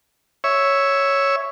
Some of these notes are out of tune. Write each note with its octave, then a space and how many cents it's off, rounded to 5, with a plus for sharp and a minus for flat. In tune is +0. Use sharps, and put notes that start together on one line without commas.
C#5 +0 E5 +0